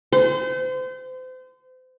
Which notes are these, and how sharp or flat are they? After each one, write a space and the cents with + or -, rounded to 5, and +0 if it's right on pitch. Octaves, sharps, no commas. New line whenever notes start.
C5 -35